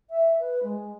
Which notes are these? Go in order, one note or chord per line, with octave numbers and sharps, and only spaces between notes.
E5
B4
G#3